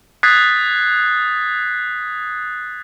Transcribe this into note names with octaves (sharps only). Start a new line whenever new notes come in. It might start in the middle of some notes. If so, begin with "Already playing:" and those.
D#6 F#6 G#6 A6 B6 C7